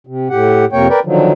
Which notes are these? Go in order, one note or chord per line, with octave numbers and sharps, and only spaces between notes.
C3
A2 G4 F#5
F2 C3 A#3 C#5 G5
A#4 B4 D5 G5
D3 D#3 F3 F#3